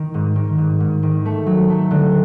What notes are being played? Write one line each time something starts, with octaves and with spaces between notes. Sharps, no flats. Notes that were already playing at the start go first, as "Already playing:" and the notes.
Already playing: D#3
G#2
D#3
G#2
G#2
D#3
A3
F#3
A3
D3